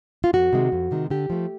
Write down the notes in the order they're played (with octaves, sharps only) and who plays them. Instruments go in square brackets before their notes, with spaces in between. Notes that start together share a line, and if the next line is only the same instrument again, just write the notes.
[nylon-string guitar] F4
F2 F#4
C3 D#3 G#3
F2
C3 D#3 G#3
D3 G4
F3 A3